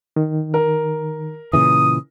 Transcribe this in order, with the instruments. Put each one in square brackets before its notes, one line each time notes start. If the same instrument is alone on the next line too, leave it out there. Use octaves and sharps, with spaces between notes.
[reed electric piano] D#3
[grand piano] A#4
[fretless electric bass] A#2 C#3 E3 [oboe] D#6